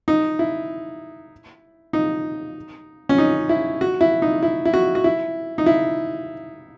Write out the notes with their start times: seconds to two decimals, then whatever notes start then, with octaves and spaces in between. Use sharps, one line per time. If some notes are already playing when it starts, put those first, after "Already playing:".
0.08 D#4
0.39 E4
1.93 D#4
3.09 C#4
3.18 D#4
3.49 E4
3.81 F#4
4.01 E4
4.22 D#4
4.43 E4
4.65 E4
4.74 F#4
4.95 F#4
5.04 E4
5.58 D#4
5.66 E4